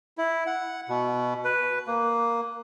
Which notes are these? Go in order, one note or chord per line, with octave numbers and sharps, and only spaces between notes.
E4
F#5
B2
B4
A#3